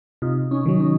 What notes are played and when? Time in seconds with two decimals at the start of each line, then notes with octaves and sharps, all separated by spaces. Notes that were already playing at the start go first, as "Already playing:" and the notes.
0.22 C3 D#4 F4
0.51 C#4 D#4
0.66 D#3 F#3
0.80 C#4 D#4